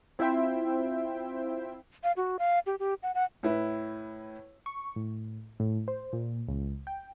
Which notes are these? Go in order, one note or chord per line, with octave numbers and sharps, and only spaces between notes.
C4 E4 F4 C5 E5 G5
F5
F#4
F5
G4
G4
F#5
F#5
A2 E4 B4
C#6
A2
A2
C5
A#2
C#2
G5